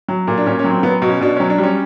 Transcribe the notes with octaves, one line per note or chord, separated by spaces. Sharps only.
F#3
A#2
D4
A#2 C#4
C#4
F#3
C4
F#3 B3
B2
C#4
B2 D4
F#3 C#4
D4
G3
C#4